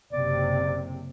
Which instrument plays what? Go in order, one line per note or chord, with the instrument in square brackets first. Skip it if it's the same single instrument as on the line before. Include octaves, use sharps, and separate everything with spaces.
[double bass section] F#1 C3 [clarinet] D5